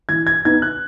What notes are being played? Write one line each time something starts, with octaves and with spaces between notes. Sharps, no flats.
E3 G#6
G#6
B3 D#4 G#6
F#6